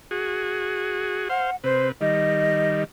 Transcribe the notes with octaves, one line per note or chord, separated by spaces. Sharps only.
F#4 G#4
C5 F5 F#5
C3 B4 C5
D#3 G3 D#5